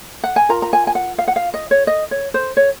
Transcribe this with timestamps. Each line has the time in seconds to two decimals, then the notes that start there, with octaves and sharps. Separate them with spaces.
0.24 F#5
0.36 G#5
0.49 F4 A#4 A#5
0.62 A#5
0.73 G#5
0.87 G#5
0.95 F#5
1.18 F5
1.28 F#5
1.36 F5
1.54 D#5
1.71 C#5
1.87 D#5
2.11 C#5
2.34 C5
2.57 C#5